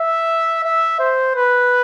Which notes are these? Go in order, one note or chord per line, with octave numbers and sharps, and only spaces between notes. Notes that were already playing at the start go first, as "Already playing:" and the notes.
Already playing: E5
E5
C5
B4